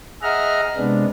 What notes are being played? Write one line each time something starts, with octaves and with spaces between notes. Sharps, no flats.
G#4 D#5 E5 F#5 A#5 F6
C3 G#3 B3 D4